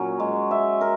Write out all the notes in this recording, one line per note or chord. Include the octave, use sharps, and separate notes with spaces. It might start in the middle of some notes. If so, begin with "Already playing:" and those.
Already playing: A#2 F#3 C#4
G#3
E5
A#4